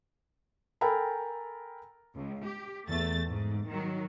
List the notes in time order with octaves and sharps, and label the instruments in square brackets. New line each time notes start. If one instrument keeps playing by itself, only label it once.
[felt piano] A4 A#4 G5 G#5 A#5 B5
[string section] C#2
G4
E2 A3 A6
G#2
D#3 F#3